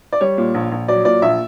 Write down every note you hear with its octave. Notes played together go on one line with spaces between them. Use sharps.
D5
G3 C#5
A#2
A#1
A#1
F#3 D5
A#2 D5
A#1 E5